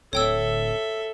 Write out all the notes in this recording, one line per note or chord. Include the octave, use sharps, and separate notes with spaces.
D1 A4 C#5 E5 G5 E6